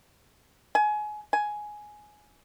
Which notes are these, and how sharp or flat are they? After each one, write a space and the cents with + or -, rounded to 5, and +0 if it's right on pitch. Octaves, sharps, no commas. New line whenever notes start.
G#5 +25
G#5 +10